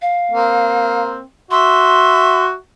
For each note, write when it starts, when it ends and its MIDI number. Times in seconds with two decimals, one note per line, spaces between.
0.02 1.02 77
0.31 1.20 58
0.31 1.20 60
1.51 2.53 66
1.51 2.53 76
1.51 2.46 84